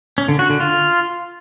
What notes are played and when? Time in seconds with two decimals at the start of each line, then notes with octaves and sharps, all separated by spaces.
0.18 C#4
0.28 D3
0.39 F#4
0.50 D3
0.60 F4